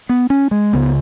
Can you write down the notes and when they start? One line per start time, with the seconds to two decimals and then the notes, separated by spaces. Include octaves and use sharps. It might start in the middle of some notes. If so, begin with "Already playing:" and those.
0.09 B3
0.30 C#4
0.51 G#3
0.73 C#2 C#3 B3